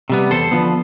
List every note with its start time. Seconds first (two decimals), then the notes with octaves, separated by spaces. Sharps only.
0.10 C3 G3 B3
0.30 E2 A4 C5
0.52 D3 F3 B3